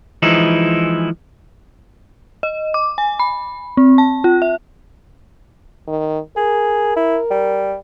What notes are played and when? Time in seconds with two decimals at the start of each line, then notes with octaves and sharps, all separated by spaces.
0.22 E3 F3 G#3 D#4 E4
2.43 D#5
2.74 D6
2.98 G#5
3.19 B5
3.77 C4
3.98 A5
4.24 F4
4.42 E5
5.87 D#3
6.36 G#4 A#4
6.96 E4
7.30 G3